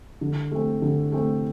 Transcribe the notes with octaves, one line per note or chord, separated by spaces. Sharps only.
D3
A3 C4
D3
A3 C4